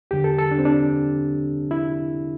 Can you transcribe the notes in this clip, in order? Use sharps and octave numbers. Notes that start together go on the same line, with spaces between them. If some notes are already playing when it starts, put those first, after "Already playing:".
E2 D3 G3 G4
A4
A4
D4
C4
D4
E4